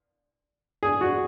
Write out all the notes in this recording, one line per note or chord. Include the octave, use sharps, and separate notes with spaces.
G#4
F#4